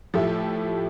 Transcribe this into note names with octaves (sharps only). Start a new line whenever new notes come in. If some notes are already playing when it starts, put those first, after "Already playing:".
A2 F3 A3 E4 G4